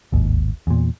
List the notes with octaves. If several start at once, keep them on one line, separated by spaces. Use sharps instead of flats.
D1 G#1 D#2
E2 A#2